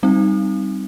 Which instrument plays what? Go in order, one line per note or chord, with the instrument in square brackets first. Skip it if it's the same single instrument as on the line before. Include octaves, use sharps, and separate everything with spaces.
[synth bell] G3 C4 D#4